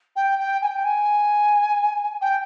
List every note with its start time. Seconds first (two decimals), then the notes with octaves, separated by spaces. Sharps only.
0.16 G5
0.39 G5
0.62 G#5
0.67 G5
0.85 G#5
2.21 G5